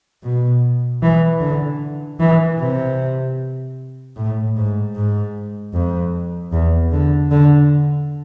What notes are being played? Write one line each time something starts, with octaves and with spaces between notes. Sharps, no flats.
B2
E3
D3
E3
C3
A2
G#2
G#2
F2
E2
D3
D3